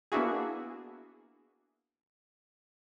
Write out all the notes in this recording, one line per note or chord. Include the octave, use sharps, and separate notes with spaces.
A#3 B3 D4 E4 F#4 G#4